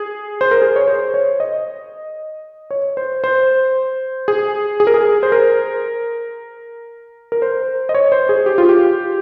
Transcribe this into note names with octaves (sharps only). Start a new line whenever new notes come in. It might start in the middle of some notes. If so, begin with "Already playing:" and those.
Already playing: G#4
C5
A#4
G#4
C#5
C5
C#5
D#5
C#5
C5
C5
G#4
G#4
A#4
G#4
C5
A#4
A#4
C5
D#5
C#5
C5
G#4
G4
F4
G4